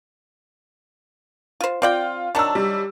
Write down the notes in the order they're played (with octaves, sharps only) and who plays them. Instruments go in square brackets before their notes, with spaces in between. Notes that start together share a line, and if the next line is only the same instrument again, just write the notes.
[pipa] F4 C5
[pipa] C4 D5 G5 [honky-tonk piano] F4
[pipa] D#3 F#3 D4 [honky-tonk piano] A5 E6
[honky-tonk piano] G3